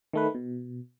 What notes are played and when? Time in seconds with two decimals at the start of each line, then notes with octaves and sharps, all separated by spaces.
0.13 D#3 A3 B4
0.35 B2